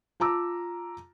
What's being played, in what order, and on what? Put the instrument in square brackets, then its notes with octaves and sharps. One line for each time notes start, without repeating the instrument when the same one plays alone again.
[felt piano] F4 A5 A#5 D6 E6